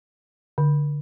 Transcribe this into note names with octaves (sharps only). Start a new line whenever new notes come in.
D3